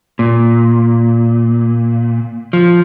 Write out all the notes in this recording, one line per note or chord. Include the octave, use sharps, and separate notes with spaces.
A#2
F3